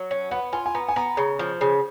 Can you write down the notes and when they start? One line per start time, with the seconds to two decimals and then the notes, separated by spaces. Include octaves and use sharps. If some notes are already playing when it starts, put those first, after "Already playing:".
Already playing: F#3
0.11 C#4
0.31 B3 F#5
0.53 F4 G#5
0.66 G#5
0.75 B3 A#5
0.88 G#5
0.96 B3 A#5
1.17 C#3
1.39 F3
1.61 C#3